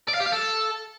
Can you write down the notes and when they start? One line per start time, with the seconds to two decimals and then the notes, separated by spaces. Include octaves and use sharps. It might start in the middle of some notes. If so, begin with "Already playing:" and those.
0.08 D5
0.14 F5
0.20 G4
0.26 F5
0.32 A4